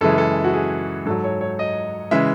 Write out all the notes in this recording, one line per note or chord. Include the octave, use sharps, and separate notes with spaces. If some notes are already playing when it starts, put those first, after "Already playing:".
F#2 C#3 E3 G#3 A4
G#4
A4
F#4
G#4
G#2 F#3 A4
C#5
C#5
D#5
C#3 E3 G#3 E5